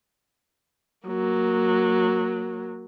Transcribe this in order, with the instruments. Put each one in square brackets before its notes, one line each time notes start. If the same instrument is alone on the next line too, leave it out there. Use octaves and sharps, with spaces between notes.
[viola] F#3 A#3